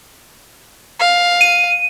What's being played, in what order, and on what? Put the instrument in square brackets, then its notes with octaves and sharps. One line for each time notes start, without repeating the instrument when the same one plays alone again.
[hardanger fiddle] F5
[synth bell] D#7